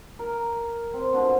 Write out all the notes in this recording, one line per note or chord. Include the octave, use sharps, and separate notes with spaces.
A#4
C4
B2 D3 F3